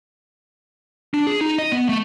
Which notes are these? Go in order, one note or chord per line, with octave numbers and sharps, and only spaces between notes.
D4
G#4
D#4
D#5
B3
A3